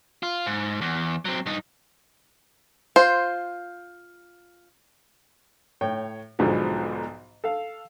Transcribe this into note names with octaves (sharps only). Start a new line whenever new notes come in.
F4
G#2
E2
F#3 C4
G2 D#4
F4 C5
A2 C#5 G5
B1 G#2 B2 D3 F3
A4 F5